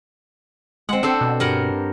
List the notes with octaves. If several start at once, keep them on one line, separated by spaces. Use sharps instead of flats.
G#3 C4 F#5
C4 D4 A4 C5
B2
G2 A#4 F#5